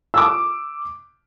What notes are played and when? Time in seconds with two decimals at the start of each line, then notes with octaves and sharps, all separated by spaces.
0.14 D6 E6